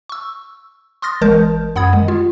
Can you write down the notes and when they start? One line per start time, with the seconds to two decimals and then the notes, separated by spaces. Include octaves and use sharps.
0.09 C#6 E6
1.02 C6 D#6 F6 A6 A#6
1.21 G#1 E3 G#3 A#4 A5 G6
1.76 F#2 F#5 B5 D#6 G#6
1.93 D#3 G#3
2.08 F4